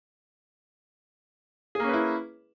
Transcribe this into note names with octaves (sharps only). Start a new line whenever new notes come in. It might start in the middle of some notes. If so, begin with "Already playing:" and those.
A#3 C#4 E4 G#4 B4